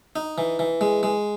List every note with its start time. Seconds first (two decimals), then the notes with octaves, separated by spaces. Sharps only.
0.16 D#4
0.38 E3
0.59 E3
0.81 G#3
1.03 G#3